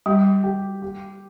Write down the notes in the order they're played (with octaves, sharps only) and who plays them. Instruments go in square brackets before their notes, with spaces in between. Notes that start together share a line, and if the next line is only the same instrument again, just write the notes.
[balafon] G3 [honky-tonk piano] G4
[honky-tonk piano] G4
G4